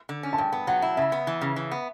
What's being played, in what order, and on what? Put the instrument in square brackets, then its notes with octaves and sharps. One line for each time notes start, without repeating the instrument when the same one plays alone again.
[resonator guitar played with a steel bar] D3
C#4
[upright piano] A5
[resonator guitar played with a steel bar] G2 [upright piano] G5
[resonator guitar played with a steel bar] B3
[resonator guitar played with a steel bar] F#3 [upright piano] F#5
[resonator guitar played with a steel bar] E4
[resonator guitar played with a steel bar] C#3 [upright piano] E5
[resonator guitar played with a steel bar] B3
E3
C#3
E3
B3